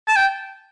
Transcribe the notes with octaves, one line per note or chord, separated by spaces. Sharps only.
A5
G5